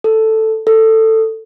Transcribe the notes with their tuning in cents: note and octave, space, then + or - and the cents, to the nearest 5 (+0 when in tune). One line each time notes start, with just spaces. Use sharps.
A4 +5
A4 +15